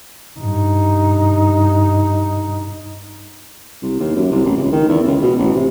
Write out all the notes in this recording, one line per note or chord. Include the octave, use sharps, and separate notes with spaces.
G2 D#4
C2
D#2
F#2
C2
A1
C#2
D#3
E2
C#2
B2
A1
C3